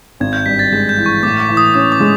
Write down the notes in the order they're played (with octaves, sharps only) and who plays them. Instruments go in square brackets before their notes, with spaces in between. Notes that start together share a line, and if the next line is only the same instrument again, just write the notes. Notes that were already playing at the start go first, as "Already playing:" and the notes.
[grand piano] G#1 [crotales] G#6
[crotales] G6
[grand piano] G2 [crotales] B6
[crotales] A6
[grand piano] G#3 [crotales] G6
[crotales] G6
[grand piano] E3
[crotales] C#6
[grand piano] A2 [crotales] D6
[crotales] D6
[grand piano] E3
[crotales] D#6
[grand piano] C#4 [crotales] D#6
[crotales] D6
[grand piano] G#3